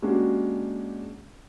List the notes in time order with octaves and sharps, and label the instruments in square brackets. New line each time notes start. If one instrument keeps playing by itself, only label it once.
[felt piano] G#3 A#3 C#4 D4 F#4 G4